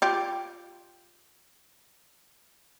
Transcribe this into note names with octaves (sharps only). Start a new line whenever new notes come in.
F4 G4